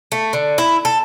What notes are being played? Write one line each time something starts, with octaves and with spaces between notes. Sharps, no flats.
A3
D3
E4
A4